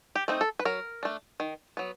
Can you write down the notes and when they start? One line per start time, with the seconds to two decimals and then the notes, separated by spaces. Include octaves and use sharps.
0.15 G4
0.28 A3 C4 D#4
0.41 A4
0.59 B4
0.65 F#3 A#4
1.03 A3 D4
1.40 D#3
1.77 F#3 B3